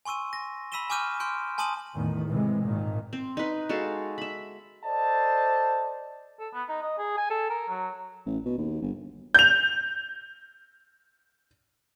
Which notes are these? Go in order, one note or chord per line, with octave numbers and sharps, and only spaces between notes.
G#5 C6 C#6 E6 D#7
A#6
B5 E6 B6 D#7 E7 G7
G#5 C#6 D6 F6 G6 D#7
C6 F6 G6 D7
G#5 A5 C6 D#6 D#7 F#7
E2 A2 D#3
A2 C3 E3 G#3
G#1 A#2 D#3
C4
D#4 B4
G#3 F#4 A4 F5
E5 B5
A4 C5 D5 D#5 A5
A4
B3
D#4
D#5
G#4
G#5
A4
A#4
F#3
A1
B2
D#2
G1
G6 F7